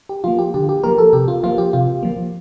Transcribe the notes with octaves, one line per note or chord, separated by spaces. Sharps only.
G4
F3 A#3 F4
G4
D3 G4
G4
F3 A#3 A#4
A4
C3 G4
F4
F3 A#3 F4
G4
C3 F4
F3 A#3